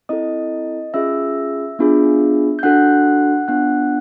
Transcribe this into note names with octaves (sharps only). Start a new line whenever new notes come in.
C4 E4 A4 D#5 D#6
C#4 F4 G#4 E5 E6
B3 D4 F4 G#4
G6
D4 F#4 A4 F#5 F#6
B3 D4 F4 F#5 F#6